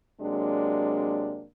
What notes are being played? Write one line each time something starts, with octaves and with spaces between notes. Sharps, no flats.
C3 F#3 G#3 A#3 D4